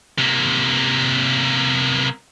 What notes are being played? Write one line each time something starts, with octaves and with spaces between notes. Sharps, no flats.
C3 A#3